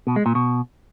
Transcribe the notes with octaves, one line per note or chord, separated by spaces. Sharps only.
B2
G#3
A#2
B2